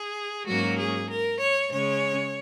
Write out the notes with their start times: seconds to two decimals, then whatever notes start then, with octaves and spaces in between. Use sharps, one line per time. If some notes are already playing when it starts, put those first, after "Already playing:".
Already playing: G#4
0.47 G#2 F#3 A#3 C#4 F#4
0.78 G#4
1.09 A#4
1.40 C#5
1.72 C#3 G#3 C#4 C#5